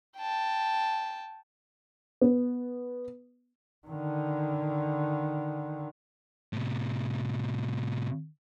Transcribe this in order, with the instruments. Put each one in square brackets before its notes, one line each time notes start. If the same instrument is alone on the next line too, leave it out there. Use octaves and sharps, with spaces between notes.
[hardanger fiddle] G5 A5
[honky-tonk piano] B3
[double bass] D3 D#3
[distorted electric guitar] A2 C3